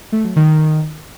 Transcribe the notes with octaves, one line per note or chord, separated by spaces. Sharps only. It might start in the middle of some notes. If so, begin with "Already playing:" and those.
A3
F#3
D#3